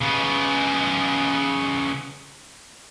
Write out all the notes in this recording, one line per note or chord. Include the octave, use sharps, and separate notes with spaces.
C#3 B3